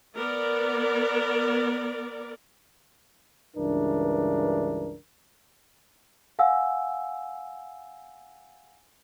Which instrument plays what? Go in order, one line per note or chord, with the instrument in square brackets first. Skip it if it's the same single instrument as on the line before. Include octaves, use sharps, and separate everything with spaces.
[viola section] B3 A#4 D5
[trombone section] C#2 G2 E3 D4 A#4
[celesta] F5 F#5 G#5 E6